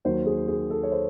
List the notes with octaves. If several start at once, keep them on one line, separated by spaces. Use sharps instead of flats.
D#2 D#3 F#3 C5
G#4
G#4
A4
C#5
C5